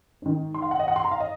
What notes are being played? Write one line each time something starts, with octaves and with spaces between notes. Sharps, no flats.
G#2 D#3
C6
F5
F#5
D#5
F#5
C6
A#5
F5
D#5